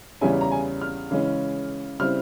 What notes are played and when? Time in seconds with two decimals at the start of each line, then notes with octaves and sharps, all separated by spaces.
0.21 E2 C#3 G3 C#4 E4 G#5
0.41 A#5
0.52 G#5
0.82 F6
1.11 C#3 E3 G#3 C#4
1.99 C#3 G3 C4 E4 F6